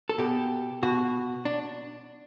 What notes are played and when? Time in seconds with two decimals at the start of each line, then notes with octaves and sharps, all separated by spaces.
0.09 A4
0.18 B2 G4
0.83 B2 F#4
1.45 D4